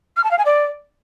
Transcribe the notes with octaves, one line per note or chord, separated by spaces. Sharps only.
F6
A5
F5
G#5
D5